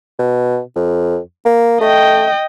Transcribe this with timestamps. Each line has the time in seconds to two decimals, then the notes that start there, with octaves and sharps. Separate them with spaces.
0.19 B2
0.76 F2
1.45 A#3
1.81 A3 D#5 G5